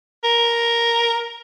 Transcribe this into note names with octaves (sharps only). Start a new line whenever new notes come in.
A#4